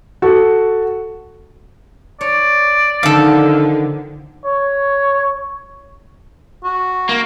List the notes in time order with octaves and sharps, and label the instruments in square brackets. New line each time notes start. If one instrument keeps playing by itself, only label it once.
[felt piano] F#4 A4
[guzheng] C#5 [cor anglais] D5
[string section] D3 [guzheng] D#3 F3 [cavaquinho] A4 F5
[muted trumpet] C#5
[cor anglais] F#4
[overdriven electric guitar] A#3